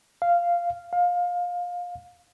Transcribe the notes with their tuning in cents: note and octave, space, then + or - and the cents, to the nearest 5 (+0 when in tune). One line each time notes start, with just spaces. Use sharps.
F5 -10
F5 +20